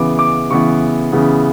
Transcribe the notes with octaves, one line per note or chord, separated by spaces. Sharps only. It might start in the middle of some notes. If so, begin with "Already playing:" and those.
Already playing: C#3 E3 B3 D6
D6
C#3 E3 B3 C#6
C#3 E3 B3